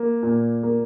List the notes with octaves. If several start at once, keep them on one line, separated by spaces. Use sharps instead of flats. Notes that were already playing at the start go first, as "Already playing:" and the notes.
Already playing: A#3
A#2
A#3